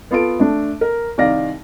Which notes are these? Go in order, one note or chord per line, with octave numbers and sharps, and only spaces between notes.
B3 F4 A4 D7
A3 D4
A#4
C2 D#3 D5 F5 A#6